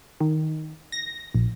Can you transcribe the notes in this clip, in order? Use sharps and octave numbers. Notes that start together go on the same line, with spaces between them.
D#3
A#6
A#1